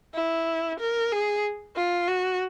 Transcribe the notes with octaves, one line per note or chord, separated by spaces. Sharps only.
E4
A#4
G#4
F4
F#4